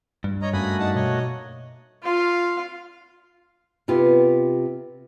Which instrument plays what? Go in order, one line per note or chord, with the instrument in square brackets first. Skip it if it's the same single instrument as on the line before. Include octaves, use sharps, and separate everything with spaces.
[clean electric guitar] G2
[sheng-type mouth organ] C#5 D#5 A#5
[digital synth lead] F#2 [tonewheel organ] A3 A#3 F#4 [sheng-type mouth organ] G#5 B5 D#6
[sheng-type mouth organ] D#4 F#5 A5
[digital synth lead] B2 [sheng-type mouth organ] C#5 D#5
[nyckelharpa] F4 F5
[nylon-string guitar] C3 B3 F4 G4